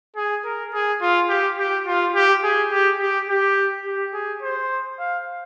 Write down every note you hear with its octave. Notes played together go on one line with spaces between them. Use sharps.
G#4
A#4
G#4
F4
G4
G4
F4
G4
G#4
G4
G4
G4
G4
G#4
C5
F5